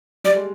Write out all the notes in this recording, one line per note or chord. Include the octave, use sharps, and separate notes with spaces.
G3 D5
G#3